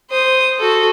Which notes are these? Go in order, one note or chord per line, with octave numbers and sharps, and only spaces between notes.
C5 D#6
F#4 A4